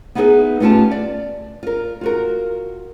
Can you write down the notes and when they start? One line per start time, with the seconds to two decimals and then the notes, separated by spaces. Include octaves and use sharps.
0.15 B3 D#4 E4 F#4 G#4 B4
0.60 A3 B3 C#4 F4 G4 A5
0.91 D5
1.63 F4 A#4
2.01 F4 F#4 A#4